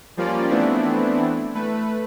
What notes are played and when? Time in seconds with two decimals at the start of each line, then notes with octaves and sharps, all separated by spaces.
0.17 F3 G3 A#3 C#4 F4 D5
0.49 E3 A3 B3 C4 D4 E4
1.55 A3 B4